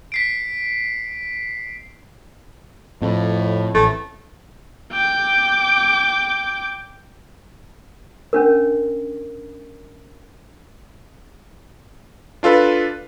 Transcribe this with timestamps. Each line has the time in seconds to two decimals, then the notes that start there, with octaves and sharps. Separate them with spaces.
0.12 B6 C7 D7
3.02 F2 A2
3.75 A1 A3
4.93 G5 D6
8.33 C#4 D4 A#4
12.43 D4 F4 A4 B4